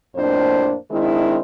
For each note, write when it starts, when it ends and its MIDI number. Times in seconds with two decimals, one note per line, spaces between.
0.16 0.74 41
0.16 0.74 45
0.16 0.74 58
0.16 0.74 62
0.16 0.74 72
0.91 1.38 51
0.91 1.38 56
0.91 1.38 60
0.91 1.38 62
0.91 1.38 64